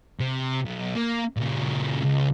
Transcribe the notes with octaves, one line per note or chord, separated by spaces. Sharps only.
C3
B1
A#3
A#2 C#3
C#2